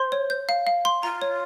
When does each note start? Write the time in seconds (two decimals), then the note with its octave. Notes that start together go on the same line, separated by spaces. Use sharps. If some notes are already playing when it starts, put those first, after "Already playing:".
Already playing: C5 C6
0.12 C#5
0.30 G6
0.49 F5
0.67 F5
0.85 C6
1.03 F4 A#5
1.22 C#5